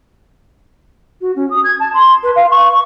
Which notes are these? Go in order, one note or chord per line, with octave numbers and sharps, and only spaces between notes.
F#4
C#4
D#6
G#6
A5
C6
B4
F5
C#6